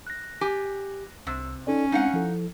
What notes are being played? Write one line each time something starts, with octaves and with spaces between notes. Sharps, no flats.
F#6 A#6
G4 G#5
C2 C3 E6
C#4 D#4 A4 D5
G#3 C4 D4 D#4 F5 F#5
F3 E4 A4